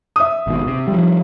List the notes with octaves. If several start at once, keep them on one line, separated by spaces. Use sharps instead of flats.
E5 D#6
G#1 B2
C3
F3 G3